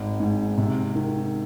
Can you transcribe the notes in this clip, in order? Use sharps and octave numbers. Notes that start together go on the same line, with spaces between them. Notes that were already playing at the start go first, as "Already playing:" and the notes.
Already playing: G#1
G#2
C3
D#3